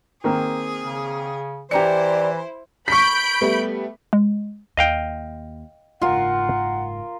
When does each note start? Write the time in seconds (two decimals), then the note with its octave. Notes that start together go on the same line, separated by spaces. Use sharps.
0.24 D#3 A#3 C4 G#4
0.84 C#3
1.71 E3 E4 G4 C5 D5 A#5 C#7
2.88 B5 C#6 G6 B6 D7
3.41 G3 A3 B3
4.13 G#3
4.77 D#2 D#5 F5 G5
6.02 F#1 G#2 F4 A#4 F#5